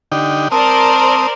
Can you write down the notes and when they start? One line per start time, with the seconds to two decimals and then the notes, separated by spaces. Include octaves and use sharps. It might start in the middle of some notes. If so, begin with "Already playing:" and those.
0.12 D3 D#4 G4
0.52 C4 A#4 C5 D5 A5 D#6